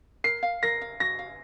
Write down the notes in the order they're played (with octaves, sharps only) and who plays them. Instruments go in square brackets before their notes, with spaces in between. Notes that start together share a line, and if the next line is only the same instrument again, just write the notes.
[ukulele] A#4 [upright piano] C7
[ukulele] F5
[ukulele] A#4 [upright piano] A#6
[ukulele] F5
[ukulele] F#4 [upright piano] A#6
[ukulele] F5